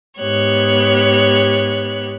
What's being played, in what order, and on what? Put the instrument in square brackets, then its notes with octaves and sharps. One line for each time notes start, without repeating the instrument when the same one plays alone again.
[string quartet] G#2 B3 G4 C#5 F#6